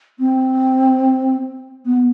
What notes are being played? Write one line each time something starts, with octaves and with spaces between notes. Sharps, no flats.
C4
B3